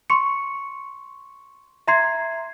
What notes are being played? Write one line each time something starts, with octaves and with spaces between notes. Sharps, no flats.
C6 C#6 C#7
E5 A#5 C6 G#6 C7